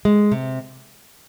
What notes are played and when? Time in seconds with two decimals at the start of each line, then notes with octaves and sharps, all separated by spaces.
0.05 G#3
0.32 C3